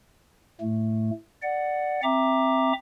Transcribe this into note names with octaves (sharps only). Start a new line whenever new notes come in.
A2 A3
D5 F#5
C4 E5 A#5 D6